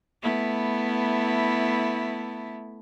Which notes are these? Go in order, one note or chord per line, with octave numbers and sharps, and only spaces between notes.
A3 B3 E4